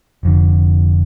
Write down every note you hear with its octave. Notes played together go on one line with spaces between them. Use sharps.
F1 F2 D3